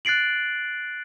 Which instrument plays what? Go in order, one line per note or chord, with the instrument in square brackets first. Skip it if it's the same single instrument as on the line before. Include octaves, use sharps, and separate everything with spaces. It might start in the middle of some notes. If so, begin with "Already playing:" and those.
[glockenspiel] F#6 A6 C7 D7 F#7